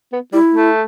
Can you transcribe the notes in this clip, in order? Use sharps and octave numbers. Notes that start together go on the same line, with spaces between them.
B3
G3 E4
A3